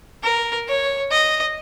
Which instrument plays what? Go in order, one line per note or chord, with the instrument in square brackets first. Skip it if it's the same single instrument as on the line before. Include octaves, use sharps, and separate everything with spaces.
[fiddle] A#4
C#5
D#5